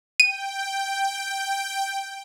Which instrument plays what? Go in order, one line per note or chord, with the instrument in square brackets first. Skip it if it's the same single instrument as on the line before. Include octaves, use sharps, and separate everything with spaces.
[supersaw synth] G5 [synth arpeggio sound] D#7